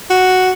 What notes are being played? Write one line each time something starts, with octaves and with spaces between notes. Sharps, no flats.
F#4